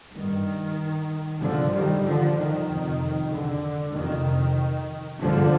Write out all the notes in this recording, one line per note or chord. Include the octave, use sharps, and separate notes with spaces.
G2 D#3
G2 D3 F3
D#3 G3
D3 F3
D#3
F2 C3
D3
F2 C3 D#3
G2 D3 F3